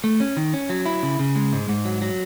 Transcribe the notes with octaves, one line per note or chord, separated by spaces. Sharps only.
A3
C#4
D#3
C#4
F#3
E4
C#3
C#3
G#3
G#2
G#2
F#3
F#3